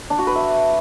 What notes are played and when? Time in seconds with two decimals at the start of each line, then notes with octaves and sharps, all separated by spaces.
0.10 D4
0.19 F#4
0.27 B4
0.35 E5